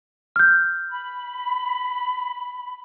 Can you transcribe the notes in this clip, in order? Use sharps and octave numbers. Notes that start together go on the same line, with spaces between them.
F6 G6
B5